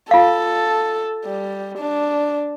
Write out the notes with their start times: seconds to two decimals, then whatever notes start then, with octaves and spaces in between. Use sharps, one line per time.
0.11 F4 A4 F5
1.26 G3
1.78 D4